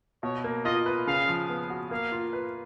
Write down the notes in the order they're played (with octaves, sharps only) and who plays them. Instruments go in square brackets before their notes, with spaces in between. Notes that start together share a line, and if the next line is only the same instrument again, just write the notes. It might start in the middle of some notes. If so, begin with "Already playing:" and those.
[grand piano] B2 [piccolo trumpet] C#5
[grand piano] A#3
[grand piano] F4 [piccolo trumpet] D#5
[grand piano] B4
[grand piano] C#3 [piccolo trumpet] F5
[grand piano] F3
B3
F#4
[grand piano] A#3 [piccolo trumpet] F5
[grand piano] F4
B4